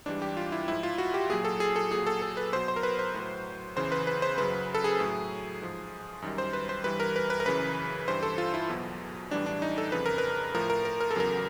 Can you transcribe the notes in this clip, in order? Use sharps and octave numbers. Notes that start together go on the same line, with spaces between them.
G#2 E3 G3 D4
G4
F4
E4
G#2 F3 E4
F4
F#4
G4
A#2 F#3 G#4
A4
G#4
A4
A#2 F#3 G#4
A4
A4
B4
B2 F#3 C5
C5
A#4
B4
C5
A2 F#3
E2 C#3 E3 C5
B4
B4
C5
F#2 C#3 F#3 B4
A4
G#4
A2 F#3
G#2 F3
F#2 D#3 G3
C5
B4
C5
G2 E3 G3 B4
A#4
B4
B4
A#4
F#2 C#3 E3 B4
G2 E3 G3 C5
A4
F4
E4
E2 B2 F#3
A2 E3 G3 D4
D4
D#4
A4
F2 C#3 F3 B4
A#4
B4
A2 F3 A#4
A#4
A#4
A#4
A4
E2 C#3 F#3 A#4